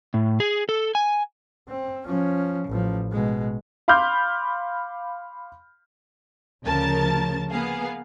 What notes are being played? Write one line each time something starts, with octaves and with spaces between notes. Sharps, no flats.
A2
G#4
A4
G#5
C4
F3 C#4
A1 F3
B2 G#3
F5 B5 C6 D6 F6 G6
D2 C#3 F3 A#4 A5 A6
A#3 B3 G#4 F5